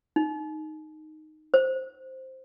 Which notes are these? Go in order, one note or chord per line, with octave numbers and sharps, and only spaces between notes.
D#4
C5